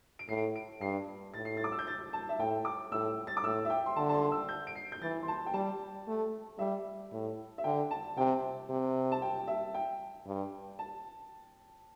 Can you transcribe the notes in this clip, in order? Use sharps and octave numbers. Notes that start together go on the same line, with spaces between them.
D7
A2 C7
D7
G2 C7
A2 A6
C7
A6
D6
E6
G6
A6
A5
E5
A2 G5
D6
A2 E6
A6
D6
A2 E6
E5
G5
C6
D3 A5
A5
C6
E6
G6
D7
C7
G6
E3 A6
C6
A5
G5
G3 A5
A3
G3 E5
A2
E5
D3 G5
A5
C3 G5
C3
A5
G5
E5
G5
G2
A5